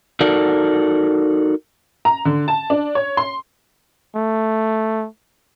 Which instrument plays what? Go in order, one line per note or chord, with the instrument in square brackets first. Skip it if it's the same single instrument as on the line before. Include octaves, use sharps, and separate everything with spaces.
[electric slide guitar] D#4 F#4 A4 A#4 D5
[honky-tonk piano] A#5
D3
A5
D4
C#5
C6
[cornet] A3